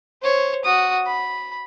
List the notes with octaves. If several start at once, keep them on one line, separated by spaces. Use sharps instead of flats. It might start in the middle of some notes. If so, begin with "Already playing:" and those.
C5 C#5
F#4 D#6
B5